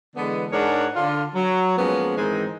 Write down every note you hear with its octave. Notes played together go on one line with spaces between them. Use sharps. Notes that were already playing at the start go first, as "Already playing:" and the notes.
D3 E3 G#3 B3
G#2 G#3 D4 A#4 C#5 F#5
D3 F4
F#3
F3 G#3 A#3 B3 C#4
G#2 D#3 E3 G#3 C4 D#4